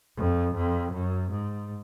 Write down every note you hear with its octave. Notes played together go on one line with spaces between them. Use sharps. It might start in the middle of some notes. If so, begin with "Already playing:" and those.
F2
F2
F#2
G#2